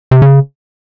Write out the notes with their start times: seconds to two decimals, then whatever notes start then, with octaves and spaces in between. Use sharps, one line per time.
0.11 C3
0.22 C#3